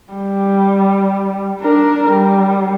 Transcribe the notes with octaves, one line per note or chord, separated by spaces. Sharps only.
G3
D4 A#4
G3